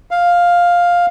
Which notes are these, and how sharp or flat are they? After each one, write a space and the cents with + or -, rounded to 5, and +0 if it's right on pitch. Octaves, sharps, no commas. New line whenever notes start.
F5 +5